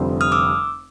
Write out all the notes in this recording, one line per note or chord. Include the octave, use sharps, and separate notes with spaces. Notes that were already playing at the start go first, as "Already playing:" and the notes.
Already playing: F1 F2 D3 G3 C4
D#6 F6
D6 E6